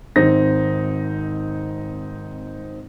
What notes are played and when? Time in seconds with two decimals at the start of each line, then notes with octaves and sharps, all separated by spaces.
0.16 G#1 C4 D#4 A#6